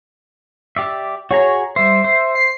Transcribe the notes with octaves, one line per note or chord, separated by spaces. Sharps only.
G4 D5 E5
F#4 G#4 C#5 A#5
G3 C5 E5
C5
C7